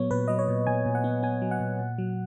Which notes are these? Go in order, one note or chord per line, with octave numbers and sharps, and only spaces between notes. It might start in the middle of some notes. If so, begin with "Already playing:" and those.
Already playing: A#2 F#3 B3 C#5
A#2 B4
F#3 D#5
C#5
A#2
A#2 G#5
A#2
F#5
B3
B3 G#5
F#3
F#5
A#2
A#2
F#3